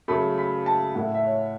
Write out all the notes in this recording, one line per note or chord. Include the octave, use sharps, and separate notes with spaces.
C#3 F#3 A3 B5
B5
A5
A2 A3 E4 F#5
E5
C#5